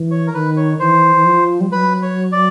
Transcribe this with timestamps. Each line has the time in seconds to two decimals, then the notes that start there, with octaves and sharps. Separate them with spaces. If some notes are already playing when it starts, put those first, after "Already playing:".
Already playing: E3
0.11 C#5
0.27 A#4
0.34 D#3 B4
0.57 C#5
0.80 E3 C5
1.16 E3
1.25 F3
1.61 G3
1.71 F#3 B4
2.02 C#5
2.32 D5